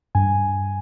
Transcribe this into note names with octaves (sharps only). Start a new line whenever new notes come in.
G2 G#5